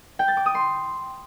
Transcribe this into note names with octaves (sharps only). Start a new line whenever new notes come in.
G5
A6
D6
D#6
C6